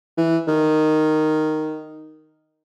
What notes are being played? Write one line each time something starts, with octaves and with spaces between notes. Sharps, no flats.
E3
D#3